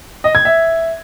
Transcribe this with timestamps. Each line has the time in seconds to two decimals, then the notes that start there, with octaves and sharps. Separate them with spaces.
0.24 D#5
0.35 G#6
0.45 E5